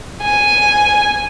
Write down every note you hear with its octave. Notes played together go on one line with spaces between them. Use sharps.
G#5